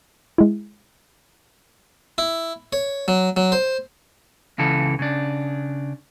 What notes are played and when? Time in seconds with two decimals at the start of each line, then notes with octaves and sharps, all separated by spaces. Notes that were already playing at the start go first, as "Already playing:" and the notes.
0.38 G#3 E4
2.18 E4
2.73 C#5
3.08 F#3
3.37 F#3
3.52 C5
4.58 C#2 C#3 E3 A4
4.99 C#3 D4